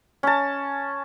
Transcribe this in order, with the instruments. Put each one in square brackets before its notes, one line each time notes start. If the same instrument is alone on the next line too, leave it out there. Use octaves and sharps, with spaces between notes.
[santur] C#4 A5